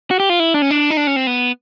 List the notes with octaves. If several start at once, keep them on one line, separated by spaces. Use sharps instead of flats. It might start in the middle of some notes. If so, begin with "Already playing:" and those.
F#4
G4
F4
E4
D4
C#4
D4
D#4
D4
C#4
C4
B3